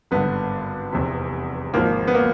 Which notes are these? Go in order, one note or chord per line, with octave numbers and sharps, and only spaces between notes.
G#1 G2 D3 B3
F1 E2 C3
G#1 G#2 F3 A#3
B3
A#3